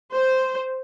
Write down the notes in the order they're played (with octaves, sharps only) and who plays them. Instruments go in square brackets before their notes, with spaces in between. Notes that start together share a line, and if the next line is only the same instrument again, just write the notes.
[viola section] C5